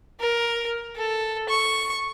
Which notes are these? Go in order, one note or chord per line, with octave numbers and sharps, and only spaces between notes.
A#4
A4
C#6